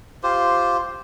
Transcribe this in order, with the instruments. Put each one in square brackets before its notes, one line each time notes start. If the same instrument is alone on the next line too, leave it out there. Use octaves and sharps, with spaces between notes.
[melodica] F4 G4 C5